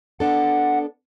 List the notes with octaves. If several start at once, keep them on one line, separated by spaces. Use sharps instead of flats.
B3 D4 A4 F#5